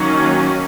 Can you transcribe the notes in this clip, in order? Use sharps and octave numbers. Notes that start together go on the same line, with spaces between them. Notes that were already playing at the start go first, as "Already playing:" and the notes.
Already playing: D#3 F#3 A#3 C#4